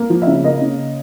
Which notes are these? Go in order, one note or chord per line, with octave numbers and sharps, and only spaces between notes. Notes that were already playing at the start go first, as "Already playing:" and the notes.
Already playing: A#3
F3
E5
C#3
A#3 D#5
C#3